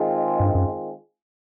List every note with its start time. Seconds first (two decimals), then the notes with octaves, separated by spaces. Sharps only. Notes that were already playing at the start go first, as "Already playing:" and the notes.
Already playing: D#3 G#3 C4 F4 G#4
0.40 G2
0.55 F#2